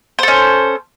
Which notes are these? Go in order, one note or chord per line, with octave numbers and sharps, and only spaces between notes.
C#4 A4 C5